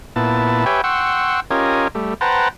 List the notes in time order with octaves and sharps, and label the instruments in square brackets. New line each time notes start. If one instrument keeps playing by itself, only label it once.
[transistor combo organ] A#2 B3 E4 A5
G4 B4 C#5 E5 G5 G#5
F#5 G5 C6 C#6 E6
C#4 F4 G4 A#4 D#5 G#5
G3 A3
B4 C5 F#5 G5 A5 A#5